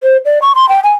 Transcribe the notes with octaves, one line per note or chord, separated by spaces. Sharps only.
C5
D5
C#6
C6
G5
G#5